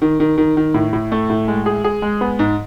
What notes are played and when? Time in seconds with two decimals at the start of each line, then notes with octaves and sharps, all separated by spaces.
0.02 D#3
0.20 D#3
0.38 D#3
0.57 D#3
0.74 A2
0.93 A2
1.12 A3
1.30 A2
1.48 G#3
1.66 G#4
1.84 G#4
2.02 G#3
2.21 B3
2.39 G#2